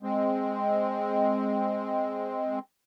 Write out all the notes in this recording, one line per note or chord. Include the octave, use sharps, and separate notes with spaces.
G#3 C4